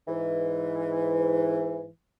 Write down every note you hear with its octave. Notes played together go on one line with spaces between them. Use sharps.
G#2 E3